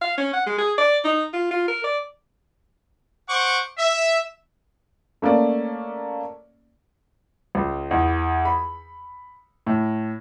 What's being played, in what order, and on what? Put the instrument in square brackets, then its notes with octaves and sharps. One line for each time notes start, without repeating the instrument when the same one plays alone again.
[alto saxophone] F5
C#4
F#5
G#3
G#4
D5
D#4
F4
F4
A#4
D5
[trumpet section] C5 F#5 C#6 D6
E5
[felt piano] A3 A#3 C#4 D5
[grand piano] C#2
E2
B5
A2